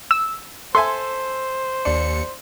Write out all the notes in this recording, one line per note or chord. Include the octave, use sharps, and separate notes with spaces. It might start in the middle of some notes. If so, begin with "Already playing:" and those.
E6
A4 C5 E5 G#5 C6
D#2 D4 C#7